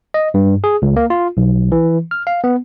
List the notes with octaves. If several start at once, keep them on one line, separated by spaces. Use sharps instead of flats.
D#5
G2
G#4
C#2
A#3
F4
B1
E3
F6
F5
B3